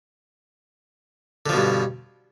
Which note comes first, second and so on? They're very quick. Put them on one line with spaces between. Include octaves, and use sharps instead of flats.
D3 F3 B2 G2